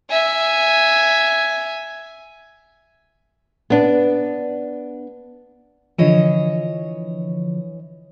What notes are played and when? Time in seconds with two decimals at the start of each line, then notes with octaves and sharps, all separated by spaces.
0.10 E5 G#5
3.70 B3 D4
5.98 D3 E3 F3 C#5 D#5